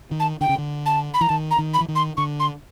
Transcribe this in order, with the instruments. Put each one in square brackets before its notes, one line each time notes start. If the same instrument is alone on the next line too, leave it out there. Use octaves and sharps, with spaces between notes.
[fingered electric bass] D#3
[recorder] A5
[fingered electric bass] D3 [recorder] G5
[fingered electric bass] C#3
D3
[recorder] A5
B5
[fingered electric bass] E3 [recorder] A#5
[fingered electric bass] D#3 [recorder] A5
[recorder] A#5
[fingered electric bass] D#3
[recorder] B5
[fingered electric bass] E3
D#3
[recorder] C6
[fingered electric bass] D3 [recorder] C#6
[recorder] C6